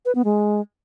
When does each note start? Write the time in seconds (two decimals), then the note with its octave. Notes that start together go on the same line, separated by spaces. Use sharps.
0.05 B4
0.15 B3
0.25 G#3